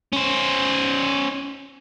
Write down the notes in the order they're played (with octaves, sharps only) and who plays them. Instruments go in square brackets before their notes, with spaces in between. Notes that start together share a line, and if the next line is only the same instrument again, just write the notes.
[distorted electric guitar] C#4 C5